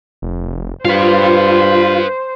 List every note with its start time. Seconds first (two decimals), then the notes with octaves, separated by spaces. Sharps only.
0.22 F1
0.85 G2 F4 B4 C5 F5